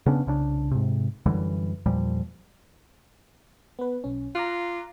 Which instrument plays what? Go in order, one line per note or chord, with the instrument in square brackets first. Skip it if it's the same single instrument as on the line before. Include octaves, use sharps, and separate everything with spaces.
[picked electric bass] C#3 B3 C#4 D4
C2 C#3 D4
G#2 C3
F#2 D3 E3 G3
E2 A#2 F3 G3
[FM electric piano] B3 B4
B1 C#4
[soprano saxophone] F4 [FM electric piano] A#5 D6 F#6